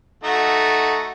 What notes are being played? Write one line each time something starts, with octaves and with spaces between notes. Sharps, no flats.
A3 D#4 F#4